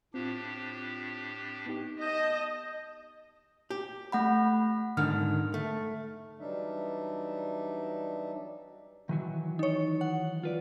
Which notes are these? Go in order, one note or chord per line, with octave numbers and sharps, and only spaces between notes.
A2 C4 D4 F4 G4
B3 D#4 G4
D#5 A5 G6 A#6
G4
A3 F#5 B5
G#2 D3 D#3 F6
A3
E3 F#3 G3 D4 D#4 E5
D#3 E3 F#3
D#4 C#5
F#5
F4 B4 D5